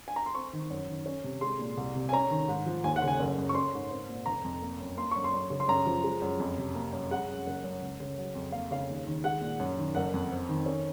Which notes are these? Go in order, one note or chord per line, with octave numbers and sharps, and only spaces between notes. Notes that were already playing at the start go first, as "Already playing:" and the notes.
G#5
A#5
C6
C4 C#6
D#3
F#2
D#3
C#4
C3
G#3 C6
A#2
C2
C3
G#5
C#4 A#5
D#3
G#2
F3
D#2 G#5
F#5
C#3
G#5
F#1
F#2
C#6
C#4 C6
G#2
C4
A#2
F1 A#5
F2
A#3
F#2
A#3 C6
F#2 C#6
C6
F#2
C#3
C6
F#2 A#5
F3
G#3
F#2
F2
C3
A#3
F#2
G#3 F#5
F#2
F#1
F#2
C#2
C#3
F#3
F2
A#3 F5
C#3 F5
D#2
D#3
G#3 F#5
A#2
F#2
D#3
F#1 F#5
F2
C4
D#3
C#4